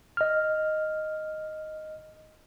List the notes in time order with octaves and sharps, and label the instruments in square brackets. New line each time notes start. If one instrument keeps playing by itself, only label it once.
[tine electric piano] D#5 F6